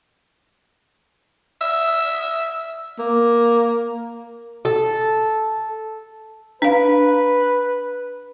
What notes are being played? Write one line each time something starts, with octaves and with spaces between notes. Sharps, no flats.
E5
A#3
A4
D4 B4 F5